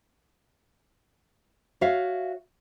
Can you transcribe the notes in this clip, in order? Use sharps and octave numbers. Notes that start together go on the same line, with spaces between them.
F#4 C#5 E5 F5